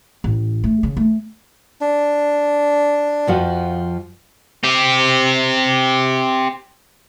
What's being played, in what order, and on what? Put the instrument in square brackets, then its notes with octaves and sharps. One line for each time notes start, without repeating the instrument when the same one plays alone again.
[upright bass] A1
A3
C#3
A3
[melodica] D4
[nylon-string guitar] F2 F3 F#4
[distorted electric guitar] C4 G4